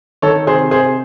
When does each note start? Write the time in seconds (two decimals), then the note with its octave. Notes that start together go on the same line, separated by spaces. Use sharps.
0.22 D#3 A4 C#5
0.47 C3 G#4 C5
0.71 C3 G#4 C5